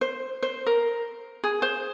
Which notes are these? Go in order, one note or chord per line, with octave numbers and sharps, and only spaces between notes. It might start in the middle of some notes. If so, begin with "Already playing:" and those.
C5
C5
A#4
G#4
C5